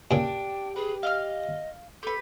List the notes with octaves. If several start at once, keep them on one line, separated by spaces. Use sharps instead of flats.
A#2 C#3 D4 G4 G5
G#4 B4
D#5 F5 F6
G4 A4 B4